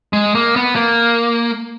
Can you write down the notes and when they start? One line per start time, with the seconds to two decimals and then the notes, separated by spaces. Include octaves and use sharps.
0.13 G#3
0.35 A#3
0.56 B3
0.76 A#3